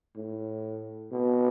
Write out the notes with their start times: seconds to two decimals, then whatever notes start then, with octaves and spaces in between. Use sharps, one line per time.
0.16 A2
1.12 B2